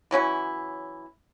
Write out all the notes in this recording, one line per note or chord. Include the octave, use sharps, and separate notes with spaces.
E3 F#3 C#4 E4